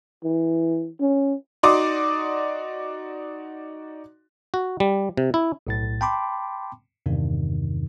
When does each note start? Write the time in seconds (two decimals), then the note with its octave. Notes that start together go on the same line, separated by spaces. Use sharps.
0.24 E3
1.01 C#4
1.63 D#4 F#4 D5 C6 D6 D#6
4.54 F#4
4.80 G3
5.17 C3
5.34 E4
5.67 B1 A2 A6
6.01 G5 A5 B5 C6 D6
7.06 E2 G2 C3 D#3